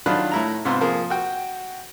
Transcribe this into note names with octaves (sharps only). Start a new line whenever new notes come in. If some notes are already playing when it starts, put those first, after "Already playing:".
D#3 F#3 D4 F4 B5 F#6
A2 E4 A#5
G#2 C3 B3 C4 F4
F3 A#3 G#4
F#4 G5